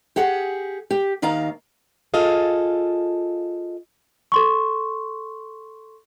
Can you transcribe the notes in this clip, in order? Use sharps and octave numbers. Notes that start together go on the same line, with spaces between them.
G4 G#4 F#5
G4
D#2 D#3 F5 A#5
F4 G#4 A4 D#5 F5
A4 C6 C#6